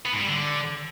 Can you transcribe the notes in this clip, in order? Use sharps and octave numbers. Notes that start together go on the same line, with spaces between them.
B3
G#2
G3
D3